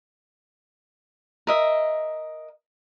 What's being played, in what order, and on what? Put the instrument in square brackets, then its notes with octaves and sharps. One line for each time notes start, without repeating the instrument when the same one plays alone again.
[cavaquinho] A#4 D#5 E5